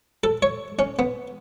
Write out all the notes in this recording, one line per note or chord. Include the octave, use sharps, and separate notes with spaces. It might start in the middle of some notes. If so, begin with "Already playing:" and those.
A4
C#5
C#4
B3